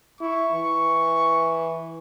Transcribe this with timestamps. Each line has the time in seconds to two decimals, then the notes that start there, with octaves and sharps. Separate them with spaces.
0.21 E4 C#6
0.52 E3